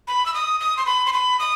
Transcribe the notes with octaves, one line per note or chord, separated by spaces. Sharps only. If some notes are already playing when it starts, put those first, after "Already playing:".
B5
E6
D#6
D#6
C6
B5
C6
B5
D#6